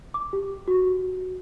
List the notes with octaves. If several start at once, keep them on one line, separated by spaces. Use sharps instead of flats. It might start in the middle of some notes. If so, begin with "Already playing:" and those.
D6
G4
F#4